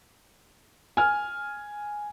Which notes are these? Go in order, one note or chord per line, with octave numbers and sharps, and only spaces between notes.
G#5 F6